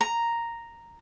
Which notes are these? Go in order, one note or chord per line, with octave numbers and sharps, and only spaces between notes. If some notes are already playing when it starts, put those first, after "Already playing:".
A#5